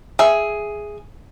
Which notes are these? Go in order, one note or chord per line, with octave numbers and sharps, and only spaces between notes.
G#4 E5